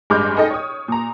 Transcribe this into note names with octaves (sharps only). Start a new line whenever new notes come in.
A1 G2 G#3 D6 F6 G6
D#4 G#4 A4 D#5 G5
C#5 D#6
A#2 A#5